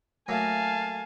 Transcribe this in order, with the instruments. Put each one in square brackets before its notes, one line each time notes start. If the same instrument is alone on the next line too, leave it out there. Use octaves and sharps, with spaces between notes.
[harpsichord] F#3 A3 A#3 [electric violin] F5 A5 [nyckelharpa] G#5